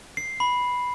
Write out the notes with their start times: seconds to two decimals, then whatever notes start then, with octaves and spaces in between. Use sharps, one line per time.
0.17 C7
0.40 B5